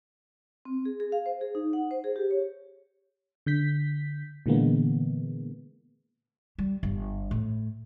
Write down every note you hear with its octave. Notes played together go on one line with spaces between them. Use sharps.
C4
G#4
G#4
F5
C5
G#4
D#4
F#5
C5
G#4
G4
C#5
D3 G6 B6
A#2 D3 E3 G#3 A#3 B3
G3
G1
A2